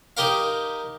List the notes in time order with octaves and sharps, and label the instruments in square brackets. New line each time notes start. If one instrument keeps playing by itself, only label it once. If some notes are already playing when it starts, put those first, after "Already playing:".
[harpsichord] D#4 G4 A#4 F5